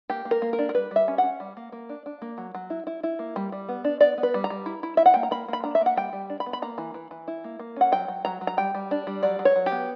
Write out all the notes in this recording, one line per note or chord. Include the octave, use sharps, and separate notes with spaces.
A#3 G4
A#3
A#4
A#3
A#4
D4
A#4
G3 B4
G3 E5
C#4
C#4 F#5
G3
A#3
A#3
D4
D4
A#3
F#3
F#3
E4
E4
E4
A#3
G3
G3
B3
D4
B3 D5
B3
B4
G3
A#5
G3
E4
E4
E4 E5
F#5
A#3 G5
A#5
A#3 B5
A#3 B5
D4 A#5
E5
A#3 F#5
G3 G5
G3
D4
B5
B3
B5
A#3 A#5
E3
E3
E3
E4
A#3
A#3
C#4 F#5
F#3 G5
F#3
F#3 A#5
F#3
A#5
G3 G5
G3
D4
G3
F#3 D5
F#3
C#5
F#3
G4
B3